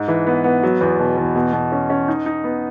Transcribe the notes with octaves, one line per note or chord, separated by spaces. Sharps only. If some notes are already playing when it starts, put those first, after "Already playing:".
Already playing: G#2
E3
B3
B3
F#3
E2
B2
E2
B2
B2
C#4
C#4
D#4
D#4
B3